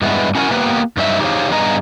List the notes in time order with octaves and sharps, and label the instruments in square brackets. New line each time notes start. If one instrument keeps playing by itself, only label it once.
[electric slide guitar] G2 G#3 B3 E4
C#4 E4 F#4 A#4 G5 G#5
A#3 B3 G4 B4
G2 F#3 D#4 G4 E5
D#4 G4 G#4 C5 C#5 F5
G2 B3 G#4 D#5 A#5